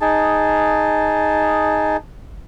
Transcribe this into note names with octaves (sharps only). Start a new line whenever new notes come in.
D#4 G#4 A5